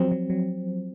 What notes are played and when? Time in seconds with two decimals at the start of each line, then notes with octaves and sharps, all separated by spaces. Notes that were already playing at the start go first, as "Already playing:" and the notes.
Already playing: F3 F#3 C4
0.12 F#3
0.30 F#3